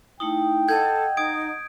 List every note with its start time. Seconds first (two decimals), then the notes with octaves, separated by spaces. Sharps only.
0.20 A3 D#4 E4 G5 D#6
0.68 A4 D#5 F#5 G6 G#6
1.17 D#4 D#6 G#6 D7